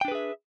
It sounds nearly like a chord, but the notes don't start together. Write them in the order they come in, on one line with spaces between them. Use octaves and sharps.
G5 D4 B4 G#4 E5